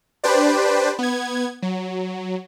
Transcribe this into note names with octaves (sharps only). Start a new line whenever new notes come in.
D4 G4 B4 C5 D5
B3 G#6
F#3